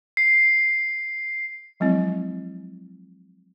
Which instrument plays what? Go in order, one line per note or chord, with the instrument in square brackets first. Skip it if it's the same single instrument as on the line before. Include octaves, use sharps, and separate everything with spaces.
[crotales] C7
[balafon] F3 F#3 G#3 C4 E4